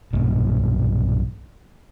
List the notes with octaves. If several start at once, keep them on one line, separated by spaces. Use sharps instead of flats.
B1 G2 A#2